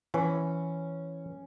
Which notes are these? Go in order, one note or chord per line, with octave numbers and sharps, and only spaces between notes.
E3 C#4